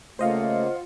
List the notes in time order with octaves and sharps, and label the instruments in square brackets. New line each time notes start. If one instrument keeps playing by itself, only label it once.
[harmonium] C#3 A#3 [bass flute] A3 [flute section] F4 F#5 [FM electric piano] C5 D#5 F5